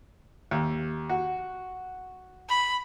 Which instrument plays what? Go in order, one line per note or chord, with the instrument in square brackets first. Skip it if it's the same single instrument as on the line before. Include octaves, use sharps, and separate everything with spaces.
[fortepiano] D#2
F#4
[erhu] B5